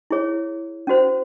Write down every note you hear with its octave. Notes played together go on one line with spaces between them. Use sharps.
E4 G#4 C#5
C#4 F#4 C5